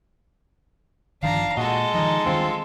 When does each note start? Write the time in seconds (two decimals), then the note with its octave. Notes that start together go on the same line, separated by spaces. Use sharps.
1.23 G1 D#3 F3 D4 F5 A#5
1.57 A#2 G#3 F#4 A4 D#5
1.94 D#3 F3 D#4
2.26 D#3 G3 C4 D4 F4